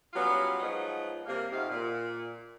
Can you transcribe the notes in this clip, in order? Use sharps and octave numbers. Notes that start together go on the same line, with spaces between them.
F#3 G3 B3 C#4 F4
F3 F#3 G#3 B3 D#4
C3 G3 A#3
F2 C3 D#4 F#4 F5
A#2